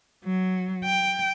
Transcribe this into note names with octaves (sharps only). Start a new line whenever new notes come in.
F#3
G5